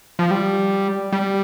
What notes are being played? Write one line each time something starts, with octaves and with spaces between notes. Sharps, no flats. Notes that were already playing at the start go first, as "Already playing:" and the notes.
F3
G3
G3